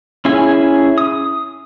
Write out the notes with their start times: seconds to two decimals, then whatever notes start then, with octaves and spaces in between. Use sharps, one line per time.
0.25 C#4 E4 G#4 G#5
0.98 D#6